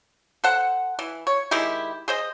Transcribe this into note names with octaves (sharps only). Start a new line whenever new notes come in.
A4 C5 F#5
E3
C#5
D#3 G#3 E4 G4
G#4 C5 D#5